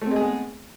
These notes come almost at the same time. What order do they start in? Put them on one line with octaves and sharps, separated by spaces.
A3 C4 G#3 G#4 B3